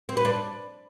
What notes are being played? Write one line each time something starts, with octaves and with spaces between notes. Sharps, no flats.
C4
B4
D4